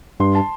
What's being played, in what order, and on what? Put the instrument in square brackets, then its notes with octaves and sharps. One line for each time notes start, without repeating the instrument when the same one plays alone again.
[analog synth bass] G2 [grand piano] C6
[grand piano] A5